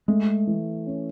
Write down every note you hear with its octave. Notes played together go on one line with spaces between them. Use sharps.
G#3 A3
E3
C#4